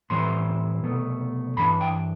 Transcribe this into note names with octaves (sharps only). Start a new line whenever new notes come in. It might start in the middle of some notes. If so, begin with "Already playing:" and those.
A2 E3 G3 C4 E4 C6
C2 B2 A3
G2 E3 A3 D4 B5
G5